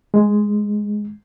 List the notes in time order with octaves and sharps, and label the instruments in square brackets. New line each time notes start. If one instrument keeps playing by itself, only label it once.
[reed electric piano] G#3